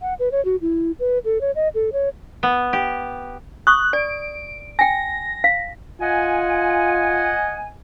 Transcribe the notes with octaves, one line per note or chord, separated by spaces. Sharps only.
F#5
B4
C#5
F#4
E4
B4
A4
C#5
D#5
A4
C#5
B3
G4
C#6 D#6 F#6
D5 D7
G5 G#5 A#6
F5
F4 D#5 F#5 G#5